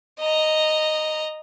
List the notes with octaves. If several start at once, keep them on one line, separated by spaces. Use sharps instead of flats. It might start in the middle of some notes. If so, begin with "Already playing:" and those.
D#5 A#5